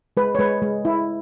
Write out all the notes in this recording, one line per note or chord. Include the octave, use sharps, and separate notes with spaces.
G#3 B4
C#5
G#3 B4
G#3
E4